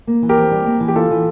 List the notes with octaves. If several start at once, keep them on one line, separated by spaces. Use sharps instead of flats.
A#3
E3
G4 A#4
F2
G3
A#3
E3
G4
E4 F4 A4
E3